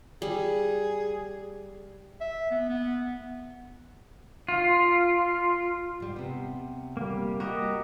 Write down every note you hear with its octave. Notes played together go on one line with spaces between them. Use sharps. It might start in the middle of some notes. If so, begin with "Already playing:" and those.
G3 G#4
E5
B3
B3
F4
G#2 G3
C3 B3
G3 A#3
F#4 G4 A#4 D#5